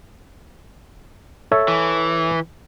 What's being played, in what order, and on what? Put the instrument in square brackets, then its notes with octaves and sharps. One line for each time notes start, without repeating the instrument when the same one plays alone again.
[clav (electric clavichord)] A4 C#5 E5
[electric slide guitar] E3